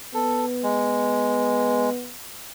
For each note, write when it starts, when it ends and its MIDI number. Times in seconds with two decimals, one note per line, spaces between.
0.14 2.11 59
0.14 0.45 69
0.63 1.90 56